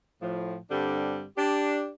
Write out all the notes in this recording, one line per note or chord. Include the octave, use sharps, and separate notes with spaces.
A2 F3
G2 D3 G3 C4 D4
D4 G4